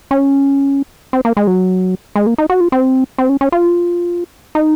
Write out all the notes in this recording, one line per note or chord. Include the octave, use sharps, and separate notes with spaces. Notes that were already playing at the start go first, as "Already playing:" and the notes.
C#4
C4
A#3
G#3
F#3
G#3
A#3
D#4
F#4
F4
C4
C4
C#4
C#4
F4
D#4